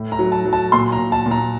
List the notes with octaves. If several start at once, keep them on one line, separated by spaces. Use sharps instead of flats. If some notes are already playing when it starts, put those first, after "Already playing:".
Already playing: A2
A#5
F#3
A5
F#3
A5
A#2 C6
A#5
A#2
A5
A#2
A#5